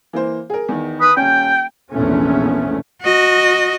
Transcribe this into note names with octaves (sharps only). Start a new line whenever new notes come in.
E3 A#3 C5
G#4 A#4
E2 D#3
B4 D#6
D#1 C#4 G5 G6
F1 A#1 E2 A3 B3 C#4
F#4 D#5